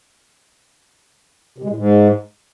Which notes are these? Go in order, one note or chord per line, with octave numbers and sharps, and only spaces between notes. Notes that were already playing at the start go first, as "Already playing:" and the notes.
C3
G#3
A2
G#2